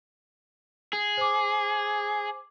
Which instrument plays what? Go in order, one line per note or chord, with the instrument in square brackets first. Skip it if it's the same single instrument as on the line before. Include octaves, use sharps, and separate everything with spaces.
[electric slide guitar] G#4
[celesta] C5 D6